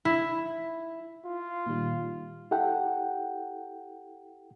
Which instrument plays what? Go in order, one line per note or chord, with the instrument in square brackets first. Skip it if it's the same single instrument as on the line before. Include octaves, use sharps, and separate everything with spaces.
[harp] E4
[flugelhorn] F4
[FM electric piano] A#2 D#3 G3
[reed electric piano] E4 G4 A4 F#5 G5